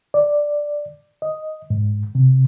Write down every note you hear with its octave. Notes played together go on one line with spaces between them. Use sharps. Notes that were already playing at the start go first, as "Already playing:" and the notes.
D5
D#5
G#2
C3